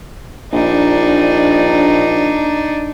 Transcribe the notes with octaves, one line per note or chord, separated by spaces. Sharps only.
A#1 D4 D#4